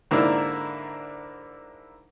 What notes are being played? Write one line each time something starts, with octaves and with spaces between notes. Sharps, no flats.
G#2 D3 A#3 D4 E4